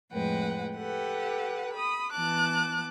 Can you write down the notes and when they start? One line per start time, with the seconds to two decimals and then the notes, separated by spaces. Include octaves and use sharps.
0.12 F2 A2 G#3 B4 F#5 G5
0.76 G4 A4 B4 F#5
1.73 B5 D#6
2.12 E3 B3 A5 D6 F#6